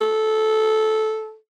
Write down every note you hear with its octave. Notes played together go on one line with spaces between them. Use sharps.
A4